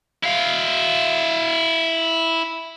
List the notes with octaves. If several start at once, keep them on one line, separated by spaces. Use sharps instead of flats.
E4 F5